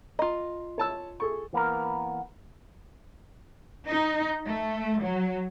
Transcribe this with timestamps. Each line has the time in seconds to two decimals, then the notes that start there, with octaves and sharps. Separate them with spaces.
0.19 F4 D#5 A#5
0.78 C#5 A5 E6
1.20 G#4 A4 C#6
1.53 E3 A#3 B3 A#4
3.86 D#4
4.47 A3
5.02 F#3